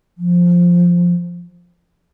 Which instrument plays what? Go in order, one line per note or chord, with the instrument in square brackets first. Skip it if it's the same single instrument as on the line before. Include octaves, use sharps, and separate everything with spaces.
[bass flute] F3